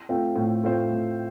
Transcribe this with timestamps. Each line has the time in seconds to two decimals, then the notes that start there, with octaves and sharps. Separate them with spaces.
0.09 A3 C4 F4 C5
0.36 A2
0.63 A3 C4 F4 C5
0.90 A2